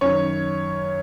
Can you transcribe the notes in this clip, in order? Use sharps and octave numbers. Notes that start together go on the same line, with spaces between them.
F#2 D#3 C#5